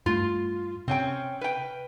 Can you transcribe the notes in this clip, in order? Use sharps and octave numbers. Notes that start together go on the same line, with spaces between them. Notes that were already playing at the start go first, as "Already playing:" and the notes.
G2 A3 F4
C3 C4 C#4 G5
B4 G5